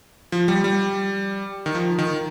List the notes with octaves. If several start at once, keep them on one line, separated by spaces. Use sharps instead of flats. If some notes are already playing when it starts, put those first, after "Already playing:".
F3
G3
G3
D#3
F3
D#3